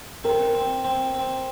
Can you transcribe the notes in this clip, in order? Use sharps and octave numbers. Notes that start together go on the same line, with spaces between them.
C4 A#4
C4
C4
C4